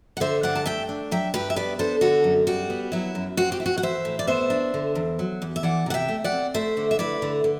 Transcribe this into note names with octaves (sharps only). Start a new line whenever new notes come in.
F#5
D3 C5 E5
G2 D5 F#5
A5
A3 E5 G5
D4
F#3 E5 G5
G2 G4 B4
E5
B3 B4 D5
D4 A4 C5
D3 F#4 A4
F#2
G3 F#4
B3
F#3 E4
F#2
C4 F#4
G4
E4
F#4
F#5
E3 C5 E5
A2
D5
B3 C5 E5
D4
D3
E2
F#3
E2
E5
E3 D5 F#5
C3 F#5
E5 G5
A3
D5 F#5
C4
A3 C5 E5
D3
E5
E4 B4 D5
D3
D3